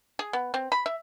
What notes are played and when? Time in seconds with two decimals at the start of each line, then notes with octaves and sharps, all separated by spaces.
0.19 G#4
0.33 B3
0.54 C4
0.72 B5
0.86 E5